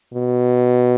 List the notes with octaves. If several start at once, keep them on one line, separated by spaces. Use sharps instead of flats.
B2